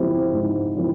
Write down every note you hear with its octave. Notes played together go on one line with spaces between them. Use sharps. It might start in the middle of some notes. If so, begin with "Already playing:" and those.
Already playing: G#2 F3 C4 E4 G4
G#2
F3 C4 E4